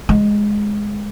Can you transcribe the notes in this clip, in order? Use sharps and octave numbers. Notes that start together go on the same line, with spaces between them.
G#3